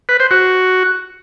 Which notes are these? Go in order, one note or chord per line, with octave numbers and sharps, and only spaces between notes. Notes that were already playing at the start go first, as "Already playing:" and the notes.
B4
C5
F#4